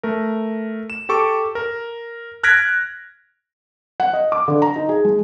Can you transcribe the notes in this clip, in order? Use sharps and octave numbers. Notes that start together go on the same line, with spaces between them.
A3 A#4
E7
G4 A4 C#6 D6
A#4
F6 F#6 G#6 A#6 B6 D7
F#5
D#5
D6
D3
A#5
D#4
G#4
G#3